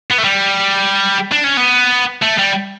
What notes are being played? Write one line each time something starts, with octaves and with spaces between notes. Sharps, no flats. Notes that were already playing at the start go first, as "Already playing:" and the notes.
B3
A3
G3
D4
C#4
B3
A3
G3